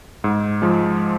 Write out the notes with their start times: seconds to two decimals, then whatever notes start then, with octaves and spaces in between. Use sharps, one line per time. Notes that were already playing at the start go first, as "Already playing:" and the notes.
0.24 G#2
0.62 F3 G#3